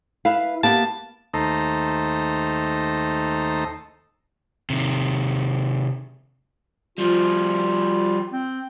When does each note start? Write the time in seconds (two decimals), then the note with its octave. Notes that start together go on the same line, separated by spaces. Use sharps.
0.25 E4 B4 F5
0.63 A#3 B3 G4 A5
1.34 D#2 A3 D#4 A4 C5 A#5
4.70 C3 D#3
6.98 F3 G3 F4
8.32 C4